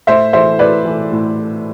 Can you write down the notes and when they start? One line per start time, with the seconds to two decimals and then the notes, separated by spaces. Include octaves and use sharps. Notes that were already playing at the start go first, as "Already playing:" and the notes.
0.07 A2 C5 E5
0.33 E3 A3 C5 E5
0.59 A2 B4 D5
0.85 E3 A3
1.12 A2